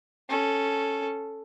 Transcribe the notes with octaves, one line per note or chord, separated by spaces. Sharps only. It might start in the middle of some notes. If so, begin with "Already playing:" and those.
C#4 A4